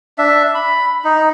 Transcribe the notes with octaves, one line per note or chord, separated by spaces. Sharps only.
D4 E5
B5
D#4